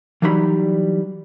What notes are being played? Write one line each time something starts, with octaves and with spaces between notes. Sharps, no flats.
E3 F#3 G3 D#4 F5 B5